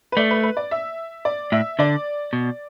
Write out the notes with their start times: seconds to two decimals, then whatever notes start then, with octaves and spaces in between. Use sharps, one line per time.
0.12 B4
0.17 A3 D5
0.31 B4
0.43 B4
0.57 D5
0.71 E5
1.25 D5
1.52 A2 E5
1.79 D3 D5
2.33 B2